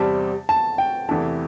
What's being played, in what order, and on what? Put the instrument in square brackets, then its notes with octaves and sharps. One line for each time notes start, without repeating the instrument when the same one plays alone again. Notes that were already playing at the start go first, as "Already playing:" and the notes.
Already playing: [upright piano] E2 C3 G3 C4 G4 [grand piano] A5
[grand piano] A5
G5
[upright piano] E2 C3 E3 A3 E4 [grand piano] A5